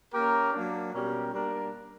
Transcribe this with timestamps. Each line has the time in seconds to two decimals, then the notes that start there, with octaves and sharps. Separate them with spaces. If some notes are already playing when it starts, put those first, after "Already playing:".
0.13 A#3 C#4 G4 A#4
0.53 F#3 A#3 D4
0.93 B2 G3 C#4 G4 A#4
1.32 G3 A#3 D4 A#4